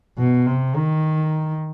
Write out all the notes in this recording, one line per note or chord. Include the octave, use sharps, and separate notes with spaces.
B2
C3
D#3